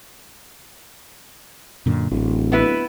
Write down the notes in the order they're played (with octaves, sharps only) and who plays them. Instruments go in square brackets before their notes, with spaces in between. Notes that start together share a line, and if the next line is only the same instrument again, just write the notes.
[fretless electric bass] F#2 A#2 D3
[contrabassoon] D1 [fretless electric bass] A1
[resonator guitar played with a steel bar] B3 E4 B4